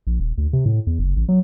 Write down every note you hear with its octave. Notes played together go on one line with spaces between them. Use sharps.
A#1
D#1
D2
C3
A2
E2
F#1
A1
F#3